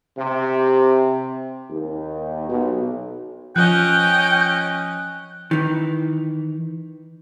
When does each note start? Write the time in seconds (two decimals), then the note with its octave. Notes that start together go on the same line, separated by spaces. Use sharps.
0.18 C3
1.70 D#2
2.49 B1
3.56 F3 C#4 D#5 G5 F#6
5.51 D#3 E3